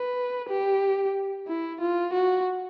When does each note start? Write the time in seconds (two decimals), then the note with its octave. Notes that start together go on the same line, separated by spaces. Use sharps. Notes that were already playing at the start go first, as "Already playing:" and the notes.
Already playing: B4
0.49 G4
1.48 E4
1.81 F4
2.13 F#4